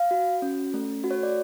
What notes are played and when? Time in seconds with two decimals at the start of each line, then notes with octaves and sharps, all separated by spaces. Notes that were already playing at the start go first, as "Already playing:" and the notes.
Already playing: F5
0.11 F#4
0.42 C#4
0.74 A3
1.04 F#4
1.11 C#5
1.23 D5